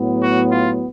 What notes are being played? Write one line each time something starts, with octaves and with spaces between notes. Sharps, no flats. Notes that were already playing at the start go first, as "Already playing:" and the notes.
Already playing: A2 F#3 B3
F#4
F4